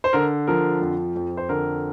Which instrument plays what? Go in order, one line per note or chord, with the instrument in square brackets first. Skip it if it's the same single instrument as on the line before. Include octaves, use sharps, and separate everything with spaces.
[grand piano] C5
D3 A#4
F3 A#4
F2
F2
C5
D3 A#4